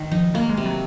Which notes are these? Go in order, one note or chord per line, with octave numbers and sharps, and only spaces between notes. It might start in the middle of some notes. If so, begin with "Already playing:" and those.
Already playing: D#3
F3 D#4
F#3 A#3
G#3
C3
F#3